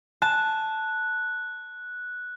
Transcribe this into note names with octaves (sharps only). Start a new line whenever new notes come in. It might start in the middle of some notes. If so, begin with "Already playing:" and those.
A5 F#6